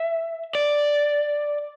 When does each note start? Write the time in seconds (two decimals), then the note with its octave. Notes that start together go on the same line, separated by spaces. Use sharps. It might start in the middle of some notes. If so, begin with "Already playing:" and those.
Already playing: E5
0.55 D5